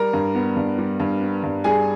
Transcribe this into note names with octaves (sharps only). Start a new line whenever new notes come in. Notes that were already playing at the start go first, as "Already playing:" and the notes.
Already playing: G3 A#4 A#5
G2
B3
G2
G3
G2
B3
G2
G3 G#4 G#5